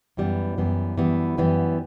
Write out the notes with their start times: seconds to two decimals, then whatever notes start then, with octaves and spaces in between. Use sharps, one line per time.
0.17 F#2 E3 G3 B3
0.58 F#2 E3 G3 B3
0.98 F#2 E3 G3 B3
1.38 F#2 E3 G3 B3